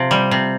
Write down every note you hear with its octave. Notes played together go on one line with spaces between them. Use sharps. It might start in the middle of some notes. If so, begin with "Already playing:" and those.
Already playing: C3 F3
G3
C3